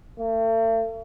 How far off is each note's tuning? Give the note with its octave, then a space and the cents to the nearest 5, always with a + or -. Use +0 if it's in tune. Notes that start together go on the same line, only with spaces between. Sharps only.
A3 +40